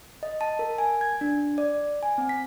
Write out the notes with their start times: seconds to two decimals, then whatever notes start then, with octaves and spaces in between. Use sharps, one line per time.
0.23 D#5
0.41 A5
0.59 A#4
0.78 G#5
1.01 G#6
1.21 D4
1.58 D5
2.03 G#5
2.18 C4
2.29 B6